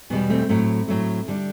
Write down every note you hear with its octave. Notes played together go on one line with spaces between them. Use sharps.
E2 B2 G3 B3
A3 C4
A2 F#3 A3
A2 F#3 A3
D3 G3